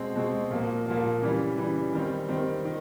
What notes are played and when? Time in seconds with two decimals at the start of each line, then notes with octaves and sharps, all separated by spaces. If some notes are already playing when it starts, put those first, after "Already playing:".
Already playing: B2 G#3 C4
0.15 B2 G#3 C4
0.51 A#2 F3 A#3
0.86 A#2 F3 A#3
1.21 C#3 E3 G3
1.57 C#3 E3 G3
1.93 D#3 G3 C4
2.29 D#3 G3 C4
2.65 D#3